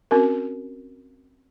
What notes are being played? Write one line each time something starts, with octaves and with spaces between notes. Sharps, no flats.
C4 C#4 F#4 A#4